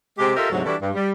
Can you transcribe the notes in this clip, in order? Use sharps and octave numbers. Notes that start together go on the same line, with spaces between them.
C3 G#3 C4 G4
F4 G4 A4 A#4 D#5 E5
D2 G#2 C3 F#3
E3 G3 D4 E4 F#4 A4
G2
G3